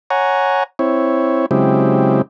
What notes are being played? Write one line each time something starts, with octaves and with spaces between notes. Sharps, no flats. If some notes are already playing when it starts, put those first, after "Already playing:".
C#5 F#5 G#5 A#5
C4 E4 C#5
C#3 F#3 G#3 C4 E4 G4